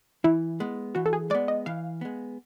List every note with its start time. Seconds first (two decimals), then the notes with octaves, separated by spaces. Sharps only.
0.24 E3 E4
0.60 G#3 B3
0.95 E3 F#4
1.06 A4
1.13 G#4
1.30 G#3 B3 D5
1.48 D#5
1.66 E3 F5
2.01 G#3 B3